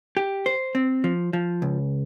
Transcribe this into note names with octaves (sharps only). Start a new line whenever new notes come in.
G4
C5
C4
F3
F3
C#2